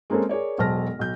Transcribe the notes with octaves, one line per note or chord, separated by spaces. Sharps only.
G#3 A#3 C4 C#4 A4
G#4 A#4 C#5 D5
E1 B1 C5 A5 F6 A#6
B1 G6